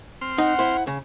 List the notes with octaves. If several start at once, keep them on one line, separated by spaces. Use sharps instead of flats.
C4 C6 F6
D#4 F#5
E4 C5
C#3